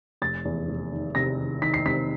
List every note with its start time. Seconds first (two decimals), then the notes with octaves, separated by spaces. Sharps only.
0.22 F1 A6
0.45 E2
0.68 F1
0.92 D#3
1.15 C3 A#6
1.39 D#3
1.62 D#3 B6
1.74 C7
1.86 C3 B6